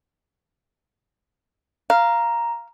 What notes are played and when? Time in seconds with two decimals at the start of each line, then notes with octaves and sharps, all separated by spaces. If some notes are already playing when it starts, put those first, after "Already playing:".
1.90 F5 A#5